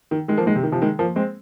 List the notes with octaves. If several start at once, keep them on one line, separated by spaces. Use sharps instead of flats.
D#3
D#3 G#3
F3 A#3
D#3 G#3
C3
D#3
C3 F3
D#3 G#3
F3 A#3
G#3 C4